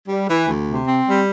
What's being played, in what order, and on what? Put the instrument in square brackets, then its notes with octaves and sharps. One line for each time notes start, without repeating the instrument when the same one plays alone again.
[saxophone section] G3
E3
D2
C3
C4
G3